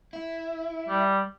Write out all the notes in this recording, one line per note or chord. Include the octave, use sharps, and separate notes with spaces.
E4
G3